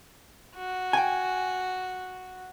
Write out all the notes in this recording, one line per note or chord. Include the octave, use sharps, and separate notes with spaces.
F#4
G5 G#5